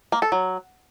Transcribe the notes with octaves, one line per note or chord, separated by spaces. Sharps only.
A#3
A4
F#3